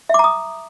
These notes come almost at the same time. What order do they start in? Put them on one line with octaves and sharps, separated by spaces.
E5 D6 A#5 D#6